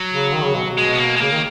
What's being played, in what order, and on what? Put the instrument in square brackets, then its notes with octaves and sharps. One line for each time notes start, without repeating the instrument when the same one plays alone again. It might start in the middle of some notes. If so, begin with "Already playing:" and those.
Already playing: [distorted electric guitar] F#3
[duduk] C#3
D#3
C#3
B2
B2
[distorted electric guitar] G#3
B3
A#3
G#3
[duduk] C#3 [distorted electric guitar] A#3
[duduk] D#3